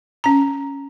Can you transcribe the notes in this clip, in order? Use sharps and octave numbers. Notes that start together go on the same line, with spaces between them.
C#4 A#5